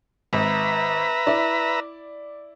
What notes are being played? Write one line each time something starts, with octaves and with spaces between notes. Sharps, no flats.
G#1 B4 E5 A#5
E4 D5